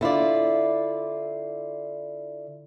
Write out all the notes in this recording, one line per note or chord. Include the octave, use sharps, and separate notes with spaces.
D3 E4 F4 D5